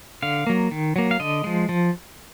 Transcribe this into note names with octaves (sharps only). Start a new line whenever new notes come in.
D3 F5
F#3 A#3
D#3
F#3 A#3
F5
D3 D#5
F3 G#3
F3